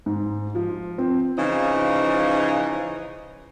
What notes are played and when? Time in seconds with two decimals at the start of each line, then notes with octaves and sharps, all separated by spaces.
0.06 G#2
0.55 F3
0.98 C4
1.39 C#3 E3 F3 D#4